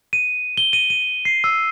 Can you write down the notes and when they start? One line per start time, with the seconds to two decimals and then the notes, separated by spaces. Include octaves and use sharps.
0.13 D#7
0.57 G7
0.73 D#7
0.90 D#7
1.25 C7
1.44 E6